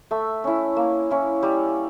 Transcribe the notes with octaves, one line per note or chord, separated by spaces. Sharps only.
A3 E5
C#4 E4
A#3
C#4 E4
G3